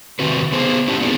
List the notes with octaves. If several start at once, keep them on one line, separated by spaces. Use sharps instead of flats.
C3 D#3 C4 F#4 B4
B3 G#4 C5
C#4 D4 E4 G4
B3 C4 D#4 G4 G#4